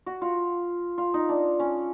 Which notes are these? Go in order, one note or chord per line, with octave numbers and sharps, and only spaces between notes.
F#4
F4
F4
D#4
D4
C#4